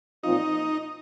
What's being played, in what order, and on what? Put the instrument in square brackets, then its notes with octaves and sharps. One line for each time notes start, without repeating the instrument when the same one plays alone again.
[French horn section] A#2 F3 C4 F4 [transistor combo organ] D#4